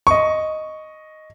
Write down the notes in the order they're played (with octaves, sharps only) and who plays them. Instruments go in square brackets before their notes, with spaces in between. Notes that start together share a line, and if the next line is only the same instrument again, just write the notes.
[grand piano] D#5 C#6